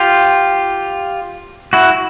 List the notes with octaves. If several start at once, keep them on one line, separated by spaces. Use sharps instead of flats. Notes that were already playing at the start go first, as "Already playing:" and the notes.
Already playing: F4 G4
E4 F#4